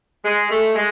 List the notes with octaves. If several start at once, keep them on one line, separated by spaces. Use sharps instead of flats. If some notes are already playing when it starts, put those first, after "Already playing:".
G#3
A3
G#3